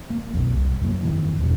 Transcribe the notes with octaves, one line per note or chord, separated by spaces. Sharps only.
A#3
B1 F2
C2
F#2 A#3
G1 F2 D#3 E3
E1 E2 G2 B2